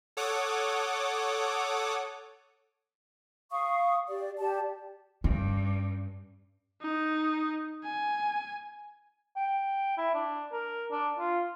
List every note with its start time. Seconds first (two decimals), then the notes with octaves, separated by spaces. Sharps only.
0.17 A4 C#5 F#5 D6 D#6
3.51 F5 C#6 D#6
4.09 G4 D5
4.38 G4 D5 A5
5.24 G2 C#4
6.82 D#4
7.84 G#5
9.36 G5
9.97 E4
10.14 D4
10.52 A#4
10.91 D4
11.19 F4